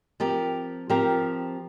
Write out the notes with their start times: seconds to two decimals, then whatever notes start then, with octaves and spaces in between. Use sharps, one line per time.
0.20 F3 C4 G4 A#4
0.90 F3 C4 G4 A#4